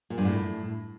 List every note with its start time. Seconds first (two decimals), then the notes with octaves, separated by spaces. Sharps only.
0.10 A#2
0.18 G2
0.25 A2